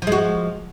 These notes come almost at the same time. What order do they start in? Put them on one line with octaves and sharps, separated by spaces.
F3 G#3 F#4